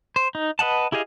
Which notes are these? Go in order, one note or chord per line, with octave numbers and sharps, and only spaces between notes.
C5
D#4
B4 D#5 F#5 A5
E4 G4 G#4 D#5 F5